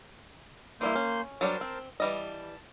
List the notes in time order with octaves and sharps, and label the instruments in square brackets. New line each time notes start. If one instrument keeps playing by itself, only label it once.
[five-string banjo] E3 G3 E4 [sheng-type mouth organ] A#3 C6 G6
[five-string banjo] C#4
[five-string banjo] F#3 G3 D4 [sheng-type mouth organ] A#4 C5 A5
[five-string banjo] C4
[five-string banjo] E3 G3 D#5 [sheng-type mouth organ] A5